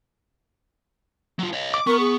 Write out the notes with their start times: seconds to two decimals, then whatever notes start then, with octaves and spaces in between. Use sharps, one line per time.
1.39 F#3 F4
1.53 C#5 D#5
1.74 D6
1.87 B3 A#4 C#6
2.00 G#4